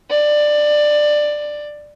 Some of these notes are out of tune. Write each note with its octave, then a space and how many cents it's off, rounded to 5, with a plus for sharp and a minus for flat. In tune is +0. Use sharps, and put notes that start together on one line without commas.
D5 +15